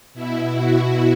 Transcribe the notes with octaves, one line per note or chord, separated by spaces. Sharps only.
B2 E4
F#4